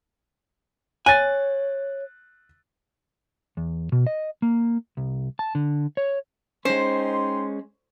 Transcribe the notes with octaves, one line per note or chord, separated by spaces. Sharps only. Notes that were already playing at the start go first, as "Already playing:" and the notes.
C#5 G#5 F#6 A6
E2
B2
D#5
A#3
C2
A5
D3
C#5
G#3 C#4 D#4 C5 G5 C6